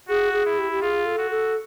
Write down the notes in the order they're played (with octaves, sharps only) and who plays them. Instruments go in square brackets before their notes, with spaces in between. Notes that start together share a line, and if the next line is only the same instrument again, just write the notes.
[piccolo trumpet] F#4 [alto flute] G#4
[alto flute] G#4
[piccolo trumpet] E4
[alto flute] G4
G4
[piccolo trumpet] F4 [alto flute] G#4
[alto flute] A4
[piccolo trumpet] F#4
[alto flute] A4